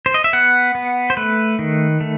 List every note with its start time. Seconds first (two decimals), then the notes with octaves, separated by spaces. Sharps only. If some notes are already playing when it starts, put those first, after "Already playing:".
0.06 C5
0.14 D#5
0.24 E5
0.33 B3 F#5
0.75 B3
1.10 C5
1.17 A3 B4
1.59 D#3
2.00 A3